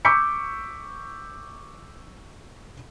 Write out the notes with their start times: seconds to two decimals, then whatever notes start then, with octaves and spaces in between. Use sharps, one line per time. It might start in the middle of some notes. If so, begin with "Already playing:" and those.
0.05 C#6 D6 E6 G6 B6 C#7